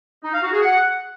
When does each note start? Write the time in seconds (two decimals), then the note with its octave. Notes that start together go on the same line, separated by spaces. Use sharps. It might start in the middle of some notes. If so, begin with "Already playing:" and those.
0.24 D#4
0.33 F5
0.43 F#4
0.52 G#4
0.62 F#5